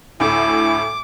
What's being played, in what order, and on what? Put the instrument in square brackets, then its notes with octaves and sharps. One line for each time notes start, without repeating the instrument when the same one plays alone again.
[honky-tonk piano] D2 A2 [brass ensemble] E4 [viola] D6